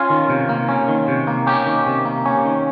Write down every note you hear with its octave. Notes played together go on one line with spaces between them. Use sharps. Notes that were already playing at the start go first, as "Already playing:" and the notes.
Already playing: C#4 F4
D#3
C3
A#3
C#4
D#3
C3
A#3
C#4 G4
D#3
C3
A#3
C#4
D#3